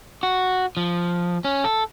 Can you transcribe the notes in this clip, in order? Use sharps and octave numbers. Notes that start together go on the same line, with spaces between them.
F#4
F3
C#4
A4